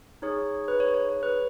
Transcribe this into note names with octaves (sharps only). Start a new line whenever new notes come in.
D#4 G#4 C#5
B4
C#5
C#5
C#5
B4